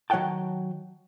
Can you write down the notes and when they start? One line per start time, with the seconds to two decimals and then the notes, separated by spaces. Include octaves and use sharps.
0.10 D#3 F#3 C#5 F#5 G5 A5